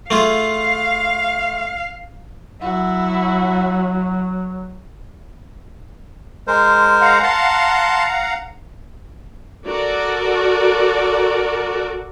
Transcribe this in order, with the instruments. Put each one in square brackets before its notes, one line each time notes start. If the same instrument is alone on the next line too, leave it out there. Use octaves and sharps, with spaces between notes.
[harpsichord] A3 F4 G#4 [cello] F5
[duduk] F#3 [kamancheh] E4 F#4
[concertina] G#3 A#4 C5
[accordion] F5 F#5 A#5
[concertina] A5 C6
[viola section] F#4 A4 A#4 D5